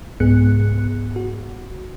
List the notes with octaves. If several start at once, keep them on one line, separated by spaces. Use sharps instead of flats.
C2 G#2 B3 G#4 F#6 C#7
F#4